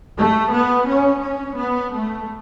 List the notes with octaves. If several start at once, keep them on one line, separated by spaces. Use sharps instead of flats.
A3
B3
C#4
C#4
B3
A3